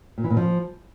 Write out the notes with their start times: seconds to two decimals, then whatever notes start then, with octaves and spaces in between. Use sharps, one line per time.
0.18 A#2
0.24 E3
0.30 A#2
0.37 F3